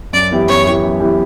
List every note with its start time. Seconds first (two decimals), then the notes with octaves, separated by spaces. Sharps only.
0.13 F#2 D5
0.31 E3 B3 E4 G4
0.48 F#2 C#5
0.66 E3 B3 E4 G4
0.83 F#2
1.00 E3 B3 E4 G4